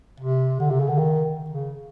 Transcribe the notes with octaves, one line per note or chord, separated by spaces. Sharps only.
C3
D3
C3
C#3
D3
D#3
C#3